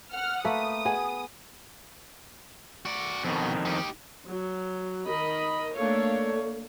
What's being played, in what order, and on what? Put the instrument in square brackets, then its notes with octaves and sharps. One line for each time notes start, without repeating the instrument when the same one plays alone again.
[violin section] F#5 F6
[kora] A3 A#3 B4 [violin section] D#6
[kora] B3 G#4
[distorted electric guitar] F#4 D5
[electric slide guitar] F2 D#3 [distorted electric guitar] B2
[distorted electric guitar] D#4 G4
[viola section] F#3
D#3 A#4 D#5 B5
A3 A#3 D4 A4 C#5 F5